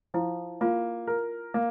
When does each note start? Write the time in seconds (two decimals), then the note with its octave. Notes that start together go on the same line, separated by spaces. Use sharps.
0.14 F3 E4
0.61 A#3 F4
1.07 A#4
1.54 A#3